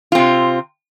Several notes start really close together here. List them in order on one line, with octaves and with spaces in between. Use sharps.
F4 C4 C3